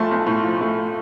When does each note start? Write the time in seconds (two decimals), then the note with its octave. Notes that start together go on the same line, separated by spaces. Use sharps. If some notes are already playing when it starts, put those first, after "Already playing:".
Already playing: B1 A2 F3 A3 A5 C6
0.11 B1
0.27 A2
0.44 F3
0.61 A3